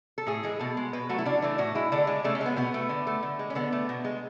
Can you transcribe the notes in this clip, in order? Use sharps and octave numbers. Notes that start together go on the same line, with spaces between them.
A4
A2 G#4
E3 G#3
B2 A4
G#3
B2 B4
F#3 A3 F#4
E4
C#3 D4
E3 A3
A2 F#4
G#3 E4
D3 D4
G#3
C#3 A3
C#4
G#3
B3
B2 B3
A3
D3
A3
D3
G#3
C#4
D3 B3
A3
B2
G#3